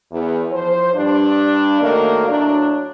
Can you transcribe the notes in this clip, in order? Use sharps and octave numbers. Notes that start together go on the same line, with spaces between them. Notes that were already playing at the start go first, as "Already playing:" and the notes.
E2
F3 C5
G2 D4
D#3 F#3 A3 A#3
A2 F#3 D4